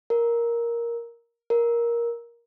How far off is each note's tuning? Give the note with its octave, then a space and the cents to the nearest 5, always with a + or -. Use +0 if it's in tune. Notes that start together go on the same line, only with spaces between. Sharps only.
A#4 +5
A#4 +10